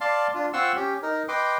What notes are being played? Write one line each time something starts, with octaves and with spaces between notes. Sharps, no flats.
D5 F5 A5 C6
D4 F4
C4 F4 F#5 C6 C#6 E6
C#4 G4
D#4 A#4
B4 D#5 G5 C6 D6